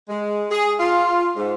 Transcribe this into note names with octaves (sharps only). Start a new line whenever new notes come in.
G#3
G#4
F4
G#2